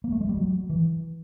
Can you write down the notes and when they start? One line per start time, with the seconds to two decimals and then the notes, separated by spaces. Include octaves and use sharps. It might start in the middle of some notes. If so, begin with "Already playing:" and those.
0.04 A#3
0.12 A3
0.21 G#3
0.29 G3
0.37 F#3
0.70 E3